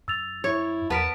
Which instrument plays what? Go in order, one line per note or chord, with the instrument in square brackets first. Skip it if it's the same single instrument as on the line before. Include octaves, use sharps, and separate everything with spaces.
[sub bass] F#2 [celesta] E6 A6 F7
[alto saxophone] E4 [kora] C#5
[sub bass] E2 [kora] B3 A#4 [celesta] B4 B6 D7 [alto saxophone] A5